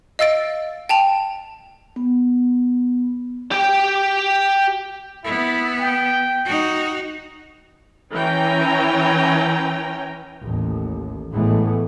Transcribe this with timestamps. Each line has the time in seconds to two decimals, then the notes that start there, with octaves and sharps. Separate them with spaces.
0.19 D#5 F5 E6 A6 D7
0.89 G5 A5 F7
1.96 B3
3.51 G4 G5
5.24 B3 E4
5.80 G5
6.45 D#4 F#4
8.13 E3 C#4 G5 G#5 A#5
10.42 A1 D#2
11.31 A2 E3 G#3 A3 B3